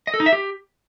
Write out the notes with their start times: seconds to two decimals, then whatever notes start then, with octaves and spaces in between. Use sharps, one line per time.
0.07 D#5
0.14 A4
0.20 D#4
0.26 E5
0.32 G4